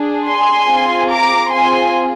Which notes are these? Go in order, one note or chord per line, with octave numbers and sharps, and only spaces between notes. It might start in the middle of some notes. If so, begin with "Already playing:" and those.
Already playing: D4 G#4
G#5 C6
C4 F4 G#4
A#5 D6
C4 F4 G#4 G#5 C6